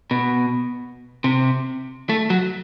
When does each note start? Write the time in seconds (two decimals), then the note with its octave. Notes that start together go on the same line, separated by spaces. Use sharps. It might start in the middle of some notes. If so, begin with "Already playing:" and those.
0.11 B2
1.24 C3
2.09 A3
2.30 F#3